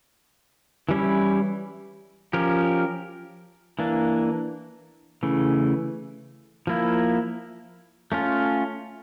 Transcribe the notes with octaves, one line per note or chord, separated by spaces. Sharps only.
E3 G3 C#4 E4
F3 C#4 G4 A#4
E3 A#3 D4
C#3 E3 A3
F3 A#3 E4
A3 C#4 F4